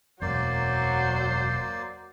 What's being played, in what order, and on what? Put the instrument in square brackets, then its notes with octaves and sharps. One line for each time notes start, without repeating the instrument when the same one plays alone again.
[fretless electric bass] E1 F#2 [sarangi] F#3 [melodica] A#3 D5 [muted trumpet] C5